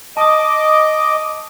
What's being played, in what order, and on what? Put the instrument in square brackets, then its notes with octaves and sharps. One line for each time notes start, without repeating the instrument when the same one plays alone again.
[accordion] D#5 D6 [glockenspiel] A5 D#6